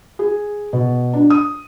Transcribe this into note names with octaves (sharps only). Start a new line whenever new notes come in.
G#4
B2
D4
D#6